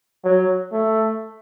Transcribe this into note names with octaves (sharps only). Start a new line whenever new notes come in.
F#3
A3